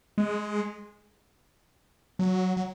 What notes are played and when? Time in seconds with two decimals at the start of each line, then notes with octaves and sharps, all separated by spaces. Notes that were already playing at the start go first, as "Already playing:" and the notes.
0.18 G#3
2.19 F#3
2.57 F#3